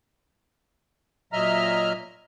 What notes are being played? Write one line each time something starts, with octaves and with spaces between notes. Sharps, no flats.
A#2 F#3 D#5 E5 A#5 F6